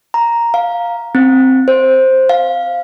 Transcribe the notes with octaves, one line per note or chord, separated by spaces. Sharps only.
A#5
F5
C4
C5
F5